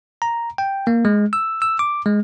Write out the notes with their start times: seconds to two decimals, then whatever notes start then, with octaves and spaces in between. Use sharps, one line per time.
0.22 A#5
0.58 G5
0.87 A#3
1.05 G#3
1.33 E6
1.62 E6
1.79 D6
2.06 G#3